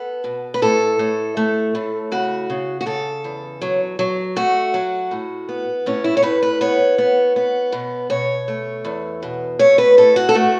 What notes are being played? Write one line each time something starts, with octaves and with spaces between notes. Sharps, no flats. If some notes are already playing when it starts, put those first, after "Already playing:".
Already playing: B3 A4
B2
B4
A2 A4
A2
A3
A2
C#3 F#4
C#3
F#4
C#3 A4
E2
F#3
F#3
A3 F#4
F#3
A2
B3
A2 C#4
E4
C#5
A2 B4
B4
B3 C#5
B3
B3
B2
B2 C#5
A3
E2
B2
A3 C#5
B4
A2 A4
F#4
A4
A3 F#4